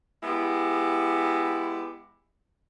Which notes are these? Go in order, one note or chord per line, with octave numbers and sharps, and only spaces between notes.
G#3 B3 E4 G4